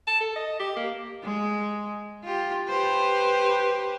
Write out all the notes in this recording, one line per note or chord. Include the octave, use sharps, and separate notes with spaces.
A5
A4
D#5
G4
A#3
G#3
F4 G4
G4 B4 C5